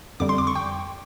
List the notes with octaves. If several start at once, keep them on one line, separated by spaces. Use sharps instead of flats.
F2 D3 G3 D6
C6
D6
C#6
G5